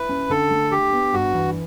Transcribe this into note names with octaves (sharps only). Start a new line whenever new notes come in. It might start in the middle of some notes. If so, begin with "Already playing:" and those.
Already playing: E4 B4
C#4
D3 A4
A3
D4 G4
B3
G2 F#4
E3